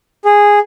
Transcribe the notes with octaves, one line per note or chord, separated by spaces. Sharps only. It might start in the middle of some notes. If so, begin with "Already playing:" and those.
G#4